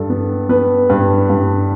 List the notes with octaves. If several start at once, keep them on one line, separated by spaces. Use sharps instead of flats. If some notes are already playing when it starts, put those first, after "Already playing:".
Already playing: G2 A4
B3
B3 B4
G2 B4
G2